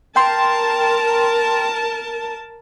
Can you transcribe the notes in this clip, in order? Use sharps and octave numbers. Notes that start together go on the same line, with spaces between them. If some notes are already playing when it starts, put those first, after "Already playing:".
A#4 G5 A5 C6